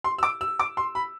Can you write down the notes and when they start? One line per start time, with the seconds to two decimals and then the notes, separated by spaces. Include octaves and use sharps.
0.04 C6
0.18 E6
0.23 D6
0.41 E6
0.59 D6
0.77 C6
0.95 B5